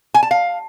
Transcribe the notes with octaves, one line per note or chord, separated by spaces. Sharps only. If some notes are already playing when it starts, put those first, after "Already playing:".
G#5
A5
F5